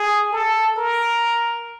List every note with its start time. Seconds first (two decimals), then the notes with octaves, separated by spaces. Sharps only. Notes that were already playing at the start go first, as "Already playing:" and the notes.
Already playing: G#4
0.32 A4
0.76 A#4